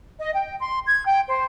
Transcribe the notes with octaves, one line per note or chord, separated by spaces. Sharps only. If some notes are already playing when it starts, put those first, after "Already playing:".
D#5
G5
C6
G#6
G5
C5